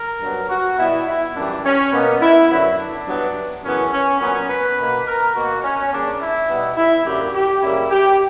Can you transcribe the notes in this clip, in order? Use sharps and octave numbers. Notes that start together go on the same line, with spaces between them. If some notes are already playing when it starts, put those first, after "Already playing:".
Already playing: A#4
G2 F#3 B3
F#4
B2 G3 B3 E4
E4
F#2 E3 G3 D4
C#4
B2 A#3 B3
E4
F#2 D3 F#3 B3 E4
D4
G2 F#3 B3
F#2 C#3 E3 B3 C#4
C#4
A#2 F#3 B3 C#4
B4
B2 A#3
A#4
B2 A#3 F#4
C#4
C#3 G3 A#3 D4
E4
B2 G3 B3
E4
F#2 D3 F#3 A#3 G4
G4
F#2 C#3 G3 A#3 E4
G4